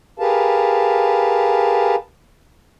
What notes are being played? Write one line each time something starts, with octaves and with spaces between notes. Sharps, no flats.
G4 G#4 A#4 B4 F5 A5